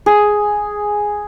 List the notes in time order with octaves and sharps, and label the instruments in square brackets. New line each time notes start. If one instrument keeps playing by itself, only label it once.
[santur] G#4